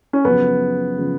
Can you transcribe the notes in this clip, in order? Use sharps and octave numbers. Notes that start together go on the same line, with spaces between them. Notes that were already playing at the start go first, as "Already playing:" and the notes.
C#4
F#2 C#3 F3 B3
C#3 F3